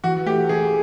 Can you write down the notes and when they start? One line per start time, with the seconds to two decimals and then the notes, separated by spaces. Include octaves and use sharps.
0.04 E3 F#4
0.26 A3 G4
0.49 E3 G#4